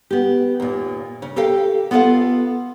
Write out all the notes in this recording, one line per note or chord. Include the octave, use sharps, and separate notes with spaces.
B3 G4
D#2 A#2
C#3
G4 A4 A#4 F5 G5
B3 F4 A4 C#5 F5 F#5